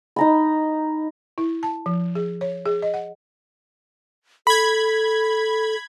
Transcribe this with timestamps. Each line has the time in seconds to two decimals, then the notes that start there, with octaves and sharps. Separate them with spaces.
0.16 D#4 A#5 B5
1.38 E4
1.63 A5
1.86 F3
2.15 G#4
2.41 C#5
2.66 G#4
2.82 D#5
2.94 F#5
4.47 A4 B5 G#6